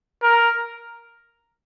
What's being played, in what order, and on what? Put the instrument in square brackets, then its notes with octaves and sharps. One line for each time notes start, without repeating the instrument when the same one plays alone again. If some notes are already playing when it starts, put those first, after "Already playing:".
[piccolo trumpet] A#4